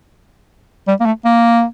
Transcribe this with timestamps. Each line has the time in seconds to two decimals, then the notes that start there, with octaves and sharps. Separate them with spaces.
0.88 G3
1.00 A#3
1.06 A3
1.25 A#3